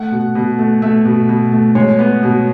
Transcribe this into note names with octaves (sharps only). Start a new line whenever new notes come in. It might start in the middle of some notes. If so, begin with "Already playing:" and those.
Already playing: A3 F#5
B2
B2
A3
A3 E5
B2
B2
A3
G#3 C#5
B3
B2